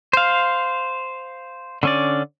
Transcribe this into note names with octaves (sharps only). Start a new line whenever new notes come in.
C5 F5
D3 C#4 D5